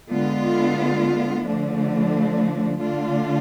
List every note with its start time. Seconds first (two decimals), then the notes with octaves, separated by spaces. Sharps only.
0.11 D3 G#3 B3 F4
1.45 D3 F3 A3 D4
2.79 D3 A3 D4 F4